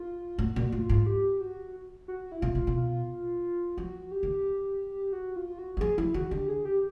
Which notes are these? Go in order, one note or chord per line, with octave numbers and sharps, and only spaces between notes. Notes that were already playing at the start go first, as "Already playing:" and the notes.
Already playing: F4
A2 F#4
A#2
A2 F4
G#2
G4
F#4
F#4
E4
B2 F4
A#2
B2
F4
F3 F#4
G4
D#3
F#4
F4
F#4
E3
F3 G#4
F3 E4
D#3 F#4
D3 G4
G#4
G4